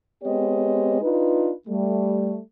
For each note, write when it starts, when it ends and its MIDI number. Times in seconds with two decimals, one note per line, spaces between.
0.23 1.01 56
0.23 1.01 59
0.23 1.01 60
0.23 1.01 67
0.23 1.01 73
0.23 1.01 75
1.02 1.51 62
1.02 1.51 63
1.02 1.51 65
1.02 1.51 71
1.68 2.38 55
1.68 2.38 57